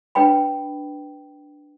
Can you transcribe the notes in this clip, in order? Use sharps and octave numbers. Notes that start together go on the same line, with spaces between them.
D4 B4 G5 B5